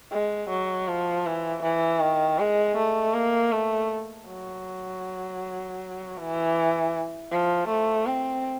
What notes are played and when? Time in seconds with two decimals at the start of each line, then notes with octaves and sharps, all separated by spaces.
0.12 G#3
0.49 F#3
0.88 F3
1.26 E3
1.63 E3
2.02 D#3
2.39 G#3
2.76 A3
3.14 A#3
3.52 A3
4.28 F#3
6.17 E3
7.31 F3
7.68 A3
8.06 C4